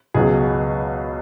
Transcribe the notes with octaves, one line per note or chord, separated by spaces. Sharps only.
C#2 B2 F#3 G#4